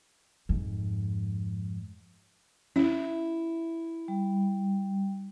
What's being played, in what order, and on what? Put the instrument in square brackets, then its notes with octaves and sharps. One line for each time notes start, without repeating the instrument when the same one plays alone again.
[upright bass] F2 G#2
[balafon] C#4 [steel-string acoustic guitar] E4
[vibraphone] G3